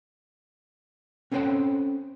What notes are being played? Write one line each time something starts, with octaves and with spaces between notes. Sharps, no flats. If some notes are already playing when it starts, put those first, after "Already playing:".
C4 C#4 A4 C5 F#5 G5